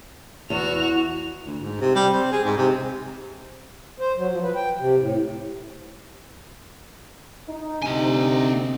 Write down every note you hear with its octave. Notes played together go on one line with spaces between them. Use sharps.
E2 F#4 F7
D2
G#2
C3
G3
C4
G#4
G#2
C3
C5
F#3
F3
B4
G5
C3
A2
D#4
D2 C3 C4 D#4 G#5